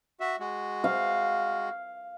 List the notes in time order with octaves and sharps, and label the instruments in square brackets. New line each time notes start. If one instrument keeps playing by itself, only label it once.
[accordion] F#4 E5
G#3 F#4
[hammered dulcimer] F5